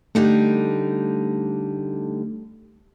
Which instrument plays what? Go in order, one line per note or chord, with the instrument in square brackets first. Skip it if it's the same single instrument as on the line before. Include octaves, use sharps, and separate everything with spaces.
[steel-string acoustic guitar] D3 G3 D#4 [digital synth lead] A3